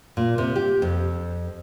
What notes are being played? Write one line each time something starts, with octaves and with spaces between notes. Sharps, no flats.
A#2
C3
G4
F2